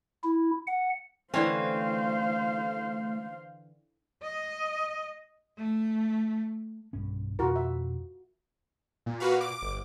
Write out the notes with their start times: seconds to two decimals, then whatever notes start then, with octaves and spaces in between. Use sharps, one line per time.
0.23 E4
0.67 F#5
1.34 D3 E3 A3 C4 C#4 C5 F5
4.22 D#5
5.58 A3
6.93 B1 G2 C#4
7.39 F2 B2 F4 F#4 A#4
7.56 E5
9.06 A#2
9.20 F#4 B4 F5
9.41 D6
9.62 G1